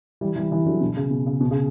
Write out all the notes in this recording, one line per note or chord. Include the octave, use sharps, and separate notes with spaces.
E3 G3
E3 G3
E3 G3
D3 F#3
B2 D3
C#3
B2
C#3
B2
C#3